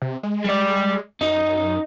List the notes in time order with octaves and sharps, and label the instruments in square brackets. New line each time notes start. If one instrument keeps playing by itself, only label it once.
[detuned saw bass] C3
G#3
[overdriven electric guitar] G3 D5
[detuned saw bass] F#2 [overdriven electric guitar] D#4